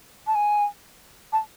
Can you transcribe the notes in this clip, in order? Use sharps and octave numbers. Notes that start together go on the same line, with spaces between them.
A5
G#5
A5